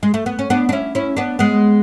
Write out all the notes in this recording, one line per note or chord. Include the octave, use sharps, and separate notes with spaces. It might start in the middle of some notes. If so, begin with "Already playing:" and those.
G#3
A3
B3
C#4
B3 D4
D4
C#4 E4
C#4 E4
B3 D4
G#3 B3